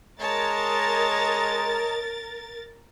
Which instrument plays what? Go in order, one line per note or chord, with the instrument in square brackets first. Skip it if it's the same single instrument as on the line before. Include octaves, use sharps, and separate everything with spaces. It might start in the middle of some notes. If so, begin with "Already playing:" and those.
[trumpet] G#3 [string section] A#4 A6 [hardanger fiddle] C#5 A5 [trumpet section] D#5 A#5